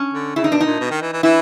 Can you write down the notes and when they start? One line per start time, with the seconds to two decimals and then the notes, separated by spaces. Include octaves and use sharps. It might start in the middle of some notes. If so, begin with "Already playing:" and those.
Already playing: C#4
0.14 D3
0.36 C#3 E4
0.44 D#4
0.50 B2 D4
0.61 D#4
0.66 A#2
0.80 B2
0.91 D#3
1.02 E3
1.13 E3
1.23 E3 E4